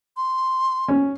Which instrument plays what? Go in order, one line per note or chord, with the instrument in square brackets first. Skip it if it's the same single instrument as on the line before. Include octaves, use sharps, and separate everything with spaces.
[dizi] C6
[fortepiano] C#4